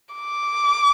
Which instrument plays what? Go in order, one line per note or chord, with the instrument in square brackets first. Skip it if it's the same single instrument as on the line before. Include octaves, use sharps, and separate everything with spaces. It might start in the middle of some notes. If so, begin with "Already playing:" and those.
[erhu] D6